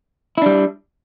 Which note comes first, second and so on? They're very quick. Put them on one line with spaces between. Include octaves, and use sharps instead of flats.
E4 D4 G3